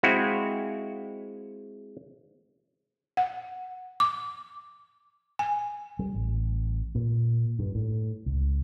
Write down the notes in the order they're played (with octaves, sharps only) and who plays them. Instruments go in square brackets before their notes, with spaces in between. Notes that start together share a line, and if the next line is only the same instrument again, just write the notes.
[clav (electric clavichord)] G#3 C4 E4 F#4 F5
[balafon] F#5
D6
G#5
[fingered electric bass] G3
A1
A#2
G2
A2
C#2